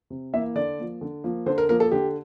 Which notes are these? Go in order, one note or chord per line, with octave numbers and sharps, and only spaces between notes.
C3
E3 A#3 E4 E5
D3 D5
F3 A#3
D3
F3 A#3
D3 C5
A#4
F3 A#3 A#4
A4
D3 G4